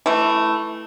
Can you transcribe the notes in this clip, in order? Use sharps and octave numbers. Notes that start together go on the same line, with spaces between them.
E3 A3